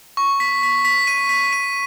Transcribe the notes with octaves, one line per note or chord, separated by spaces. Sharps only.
C#6
B6
B6
B6
D#7
B6
D#7